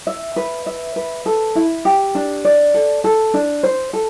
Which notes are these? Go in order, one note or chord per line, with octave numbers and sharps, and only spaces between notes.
E5
B4
E5
B4
A4
E4
G4
D4
D5
A4
A4
D4
C5
A4